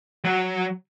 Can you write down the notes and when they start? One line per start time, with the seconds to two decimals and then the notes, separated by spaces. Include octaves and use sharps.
0.25 F#3